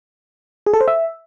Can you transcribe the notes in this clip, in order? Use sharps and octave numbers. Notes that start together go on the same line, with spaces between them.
G#4
A4
C5
E5